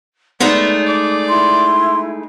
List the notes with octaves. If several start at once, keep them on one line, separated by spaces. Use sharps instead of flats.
G#3 A3 B3 D#4 D5
D5 D6
E4 C6